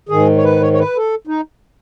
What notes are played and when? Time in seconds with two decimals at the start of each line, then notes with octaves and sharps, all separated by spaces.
0.09 G#2 D#3 G#4
0.37 C#5
0.44 B4
0.62 C#5
0.73 C#5
0.79 B4
0.97 A4
1.27 D#4